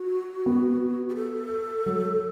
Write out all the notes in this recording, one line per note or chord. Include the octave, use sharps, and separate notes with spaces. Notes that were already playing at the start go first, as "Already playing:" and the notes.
Already playing: F#4
B3
G4
A4
F#3